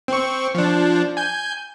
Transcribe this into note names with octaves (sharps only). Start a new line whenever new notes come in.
C4 C#6
F3 D4
G#5 G6